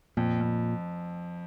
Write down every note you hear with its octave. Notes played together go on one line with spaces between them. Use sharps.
F2 A#2
F2